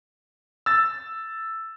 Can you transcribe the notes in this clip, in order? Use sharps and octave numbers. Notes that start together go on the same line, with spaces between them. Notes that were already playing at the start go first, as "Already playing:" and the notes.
E6 A6